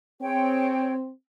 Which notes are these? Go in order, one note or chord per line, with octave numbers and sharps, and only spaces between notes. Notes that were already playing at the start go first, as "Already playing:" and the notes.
C4 G#4 C#5 G5